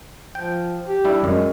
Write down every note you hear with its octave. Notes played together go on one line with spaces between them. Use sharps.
F3 G5
G4
G3 D4 E4
F#2 G#3